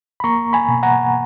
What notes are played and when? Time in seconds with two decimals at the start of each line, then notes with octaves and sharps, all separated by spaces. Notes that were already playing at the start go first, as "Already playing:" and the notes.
0.20 B5
0.24 A#3 A#5 C#6
0.53 G#5 B5
0.68 B2
0.83 F#5 A#5